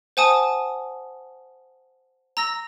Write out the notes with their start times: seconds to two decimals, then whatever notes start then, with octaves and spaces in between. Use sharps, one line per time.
0.17 C5 F#5 G#5 A5 D#6
2.37 A#5 E6 A#6